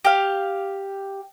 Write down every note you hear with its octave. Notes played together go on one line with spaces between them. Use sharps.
G4 F5